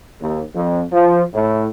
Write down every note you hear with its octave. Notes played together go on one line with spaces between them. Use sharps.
D#2
F2
F3
A2